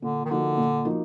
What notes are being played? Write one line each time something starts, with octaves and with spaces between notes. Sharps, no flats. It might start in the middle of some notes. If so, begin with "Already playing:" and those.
A#2 D3
D#3
D3 F3 A#3 D#4 F#4
A#2
F3 A#3 D#4 F#4